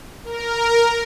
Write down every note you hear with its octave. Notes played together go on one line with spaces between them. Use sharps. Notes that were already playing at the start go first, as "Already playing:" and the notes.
A#4